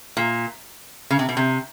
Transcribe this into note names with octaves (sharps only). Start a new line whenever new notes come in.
A#2
C#3
C3
B2
C3